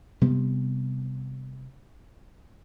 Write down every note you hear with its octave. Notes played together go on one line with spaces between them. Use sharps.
C3 G3 B3